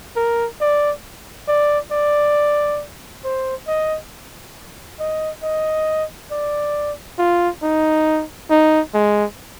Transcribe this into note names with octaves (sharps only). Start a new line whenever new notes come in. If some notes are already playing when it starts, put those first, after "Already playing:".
A#4
D5
D5
D5
C5
D#5
D#5
D#5
D5
F4
D#4
D#4
G#3